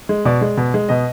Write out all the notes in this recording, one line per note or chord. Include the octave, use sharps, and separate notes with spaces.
G#3
B2 D5
G#3
B2
G#3
B2 D#5